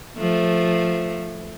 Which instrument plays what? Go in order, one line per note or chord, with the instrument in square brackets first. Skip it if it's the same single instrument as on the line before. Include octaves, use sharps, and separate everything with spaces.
[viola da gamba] F3 A3